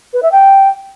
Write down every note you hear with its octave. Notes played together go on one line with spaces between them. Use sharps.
B4
E5
G5